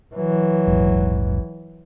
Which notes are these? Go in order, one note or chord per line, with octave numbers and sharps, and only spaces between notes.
E3 F#3
D#1 A#1 G#2